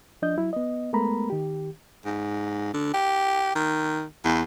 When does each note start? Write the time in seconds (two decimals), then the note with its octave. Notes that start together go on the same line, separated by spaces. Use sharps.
0.22 F3 D4 D#5 G6
0.37 F#3 E4
0.53 B3 D#5
0.93 G#3 A3 B3 A#4 A#5 B5
1.30 D#3 G4
2.06 G#2
2.74 D3
2.93 G4
3.55 D#3
4.25 E2